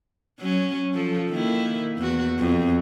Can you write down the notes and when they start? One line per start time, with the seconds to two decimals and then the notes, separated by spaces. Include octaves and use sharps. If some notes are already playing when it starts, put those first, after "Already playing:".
0.40 F#3 C#4
0.94 F3 A4
1.30 D#3 A#3 E4
1.98 E2 F#4
2.39 F2